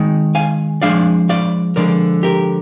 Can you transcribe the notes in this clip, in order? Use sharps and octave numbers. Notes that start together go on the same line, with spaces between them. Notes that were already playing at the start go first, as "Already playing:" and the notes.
Already playing: D#3 G#3 D#4
F5 G#5
F3 G#3 D4 D5 F5
D5 F5
D3 F3 G#3 A#4 D5
G4 A#4